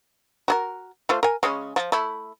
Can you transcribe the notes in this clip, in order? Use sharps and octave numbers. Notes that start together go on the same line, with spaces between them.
F#4 G#4 A#4
A3 F4 C5
A#4 G#5
C#3 G#3 C#4
F3
A3 E4